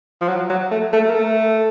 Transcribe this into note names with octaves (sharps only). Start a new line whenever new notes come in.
F3
F#3
F#3
A3
A3
A#3
A3